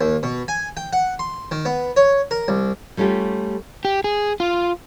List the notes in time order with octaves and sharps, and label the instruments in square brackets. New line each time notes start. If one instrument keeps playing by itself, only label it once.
[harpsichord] D#2
B2
G#5
G5
F#5
C6
D#3
B3
C#5
A#4
C2
[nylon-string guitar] G3 A3 C#4 F4 G4
[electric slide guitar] G4
G#4
F4